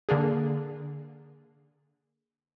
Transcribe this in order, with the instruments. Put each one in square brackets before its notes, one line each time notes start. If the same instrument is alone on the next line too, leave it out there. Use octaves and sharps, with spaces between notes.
[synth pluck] D3 A#3 D4 G#4